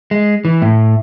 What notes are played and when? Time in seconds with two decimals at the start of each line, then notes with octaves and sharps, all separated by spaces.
0.11 G#3
0.45 E3
0.62 A2